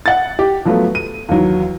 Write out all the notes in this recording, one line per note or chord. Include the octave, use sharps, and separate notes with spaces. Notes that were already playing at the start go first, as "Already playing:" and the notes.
F#5 A6
G4
F3 F#3 A3 B3
D#7
D#2 E3 F#3